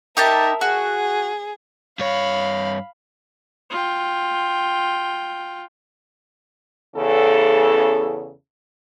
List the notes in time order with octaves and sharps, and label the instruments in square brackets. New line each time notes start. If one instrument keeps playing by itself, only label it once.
[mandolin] D#4 G4 A5 [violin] A#4 E5
[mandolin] F#4 [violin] G#4
[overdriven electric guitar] G2 C#5 [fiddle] F5 B5
[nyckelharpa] F4 G5
[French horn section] E2 C#3 A4